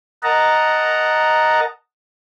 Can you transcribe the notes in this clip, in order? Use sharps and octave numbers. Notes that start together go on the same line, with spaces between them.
A#4 D#5 F#5 A5 A#5